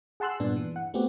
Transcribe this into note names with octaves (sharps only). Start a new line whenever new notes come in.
G#4 F#5 A5 C6 E6 F#6
G2 A#2 B3 D4
E3
F#5
A3 B3 C4 F#4 G4